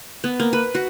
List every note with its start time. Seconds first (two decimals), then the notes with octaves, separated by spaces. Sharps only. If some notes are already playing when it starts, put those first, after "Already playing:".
0.24 B3
0.40 A#3
0.53 B4
0.75 F#4